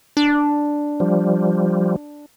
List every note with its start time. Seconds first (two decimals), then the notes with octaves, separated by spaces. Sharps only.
0.17 D4
1.00 F3 G3